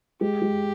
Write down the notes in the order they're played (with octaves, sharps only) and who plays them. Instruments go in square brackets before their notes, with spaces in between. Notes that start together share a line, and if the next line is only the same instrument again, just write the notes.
[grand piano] G#3 [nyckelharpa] G4
[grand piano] G#3